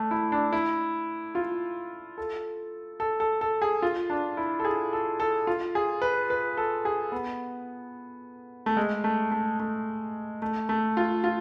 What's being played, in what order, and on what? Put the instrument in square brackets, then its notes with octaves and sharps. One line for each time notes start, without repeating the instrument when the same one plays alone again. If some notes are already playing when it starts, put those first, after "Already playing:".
Already playing: [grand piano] A3 D4
E4
D4
E4
F4
A4
A4
A4
A4
G#4
F4
D4
E4
A4
G#4
A4
A4
F4
G#4
B4
B4
A4
G#4
B3
A3
G#3
A3
A3
A3
A3
A3
F4
F4